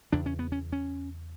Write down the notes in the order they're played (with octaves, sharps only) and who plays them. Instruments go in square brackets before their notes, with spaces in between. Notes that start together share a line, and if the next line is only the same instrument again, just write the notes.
[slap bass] E2 C#3 D4
C#4
B3
C#4
C#4